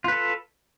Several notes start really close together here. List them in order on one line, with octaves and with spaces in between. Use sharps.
F4 B4 A4